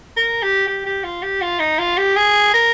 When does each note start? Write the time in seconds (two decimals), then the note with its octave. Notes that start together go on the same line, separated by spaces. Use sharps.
0.17 A#4
0.42 G4
0.67 G4
0.86 G4
1.04 F4
1.23 G4
1.42 F4
1.60 D#4
1.78 F4
1.97 G4
2.16 G#4
2.54 A#4